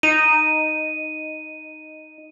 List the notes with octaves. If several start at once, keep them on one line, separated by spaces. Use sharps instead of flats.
D#4 D#7